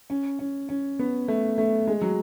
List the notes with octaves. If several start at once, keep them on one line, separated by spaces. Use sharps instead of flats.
C#4
C#4
C#4
B3
A3
A3
G#3
F#3